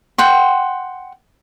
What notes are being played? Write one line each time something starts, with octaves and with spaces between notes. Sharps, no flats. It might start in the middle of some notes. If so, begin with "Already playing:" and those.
F#5 G5 C6